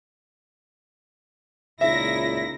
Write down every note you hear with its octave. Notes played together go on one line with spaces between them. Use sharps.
C#2 A#2 C#3 D#4 E4 E5 A#6